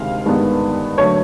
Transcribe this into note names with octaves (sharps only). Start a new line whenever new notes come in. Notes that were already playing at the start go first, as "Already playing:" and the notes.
Already playing: D2 C3 D#3 G#3 C4 F5
G2 D#3 G#3 B3
D3 F#3 A3 C#5